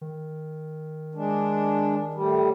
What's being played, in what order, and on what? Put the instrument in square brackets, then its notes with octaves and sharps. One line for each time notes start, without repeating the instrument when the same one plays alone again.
[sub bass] D#3
[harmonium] G#3 D4
A2 G3